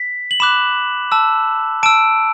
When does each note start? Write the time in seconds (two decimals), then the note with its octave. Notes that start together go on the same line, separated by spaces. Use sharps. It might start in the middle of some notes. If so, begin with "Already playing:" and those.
Already playing: B6
0.31 F#7
0.40 B5 D6 F#6 E7
1.12 A5 E6
1.83 A5 E6 D7